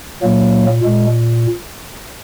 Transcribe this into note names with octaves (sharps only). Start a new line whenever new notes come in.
A#2 F#3 A#3
A#2 G#3